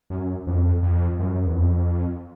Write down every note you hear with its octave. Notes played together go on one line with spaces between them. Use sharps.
F#2
F2
F2
F#2
E2
F2